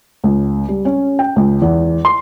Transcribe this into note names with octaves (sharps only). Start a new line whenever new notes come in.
C#2
G3
C#4
G5
C#2
E2
C6